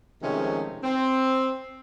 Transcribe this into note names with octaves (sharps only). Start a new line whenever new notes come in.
C3 D#3 F3 G#3 A3 C#4
C4